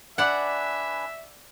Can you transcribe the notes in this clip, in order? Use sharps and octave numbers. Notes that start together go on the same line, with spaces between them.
D4 B4 D5 E5 F#5 G#5